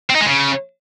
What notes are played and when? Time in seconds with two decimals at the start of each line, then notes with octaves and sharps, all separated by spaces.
0.10 C4
0.16 D#4
0.21 G#3
0.26 C#3